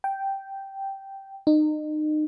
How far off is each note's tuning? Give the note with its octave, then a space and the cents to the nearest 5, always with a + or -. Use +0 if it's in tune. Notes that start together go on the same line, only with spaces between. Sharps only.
G5 -5
D#4 -30